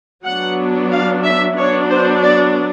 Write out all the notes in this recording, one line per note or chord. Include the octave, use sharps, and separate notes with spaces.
F#3 B3 D4 F#5
F5
E5
F#3 B3 D4 C#5
C5
D5